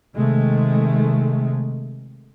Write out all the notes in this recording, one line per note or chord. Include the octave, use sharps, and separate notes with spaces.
C3 D#3 G#3 A3